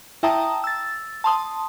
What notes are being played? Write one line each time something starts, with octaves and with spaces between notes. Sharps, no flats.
E4 E5 G5 A5 A#5 D#6
E6 A6
A5 C6 D#6